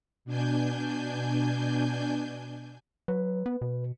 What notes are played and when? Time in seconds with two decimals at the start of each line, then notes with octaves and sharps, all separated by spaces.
0.25 B2 D4 G#5 G6
3.08 F#3 B4
3.46 B3
3.61 B2